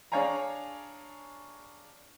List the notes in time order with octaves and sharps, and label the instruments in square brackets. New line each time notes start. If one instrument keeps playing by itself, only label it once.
[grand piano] D4 G#4 C#5 F5 G#5 A#5